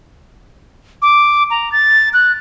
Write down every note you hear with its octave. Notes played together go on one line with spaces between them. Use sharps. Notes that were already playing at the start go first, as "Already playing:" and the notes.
D6
A#5
A6
F#6